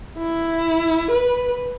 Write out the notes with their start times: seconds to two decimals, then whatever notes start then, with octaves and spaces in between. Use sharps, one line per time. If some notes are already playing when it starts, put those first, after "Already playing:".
0.18 E4
1.11 B4